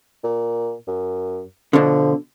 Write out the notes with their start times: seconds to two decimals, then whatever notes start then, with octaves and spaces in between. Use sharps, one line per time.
0.24 A#2
0.87 F#2
1.73 B2 D3 F3